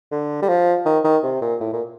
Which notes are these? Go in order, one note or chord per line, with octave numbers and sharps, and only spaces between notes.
D3
G3
F3
D#3
D#3
C3
A#2
A2
A#2